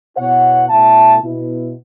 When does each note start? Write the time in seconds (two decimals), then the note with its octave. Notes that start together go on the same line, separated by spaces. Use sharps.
0.17 B2 B3 E4 C#5 F#5
0.69 B2 A3 E4 E5 A5
1.22 B2 B3 E4